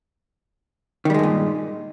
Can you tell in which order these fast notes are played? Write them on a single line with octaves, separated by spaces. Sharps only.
D#3 G3 G#3 G2 A#2